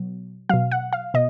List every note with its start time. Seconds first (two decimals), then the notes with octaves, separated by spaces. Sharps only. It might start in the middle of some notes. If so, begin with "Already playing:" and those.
Already playing: B2 F#3
0.49 B2 F#3 F5
0.71 F#5
0.93 F5
1.14 B2 D#5